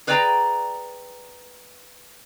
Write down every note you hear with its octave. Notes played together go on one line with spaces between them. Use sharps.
G#4 B4 D5 G5 G#5 A#5